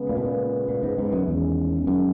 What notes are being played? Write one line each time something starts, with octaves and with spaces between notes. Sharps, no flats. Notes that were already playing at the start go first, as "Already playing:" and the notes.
Already playing: C#3 G#3 B3
A#2
B2
A#2
A#2
G#2
G#2
F#2
E2 D#3 G#3 C#4 G#4
F#2